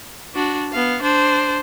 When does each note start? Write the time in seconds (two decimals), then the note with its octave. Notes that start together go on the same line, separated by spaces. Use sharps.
0.35 D4 F#4
0.73 B3 F5
1.02 D4 C5